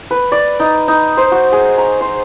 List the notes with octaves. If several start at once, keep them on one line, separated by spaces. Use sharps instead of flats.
B4
D5
D#4
D#4
C5
F#4
G#4
A#5
C5